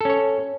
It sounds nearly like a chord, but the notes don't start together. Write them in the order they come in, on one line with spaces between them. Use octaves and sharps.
A4 C#4 C#5